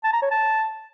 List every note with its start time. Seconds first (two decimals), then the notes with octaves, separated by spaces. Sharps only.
0.04 A5
0.13 A#5
0.22 C#5
0.31 A5